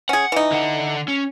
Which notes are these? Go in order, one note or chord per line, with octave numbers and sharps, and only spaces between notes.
C#4 G#4 F#5
E3 D#4
D3 F#5
C#4